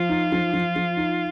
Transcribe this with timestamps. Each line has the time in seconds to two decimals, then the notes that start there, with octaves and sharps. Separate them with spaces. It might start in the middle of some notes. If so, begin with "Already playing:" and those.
Already playing: F3 F4
0.09 D#4
0.32 F3
0.54 F3
0.76 F3
0.97 D#4